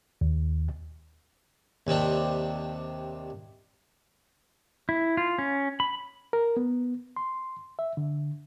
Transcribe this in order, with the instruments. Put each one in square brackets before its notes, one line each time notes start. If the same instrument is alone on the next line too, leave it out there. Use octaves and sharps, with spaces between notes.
[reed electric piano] D#2
[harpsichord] D#2 C3 C4 D4
[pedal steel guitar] E4
F4
C#4
B5
[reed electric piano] A#4
B3
C6
E5
D3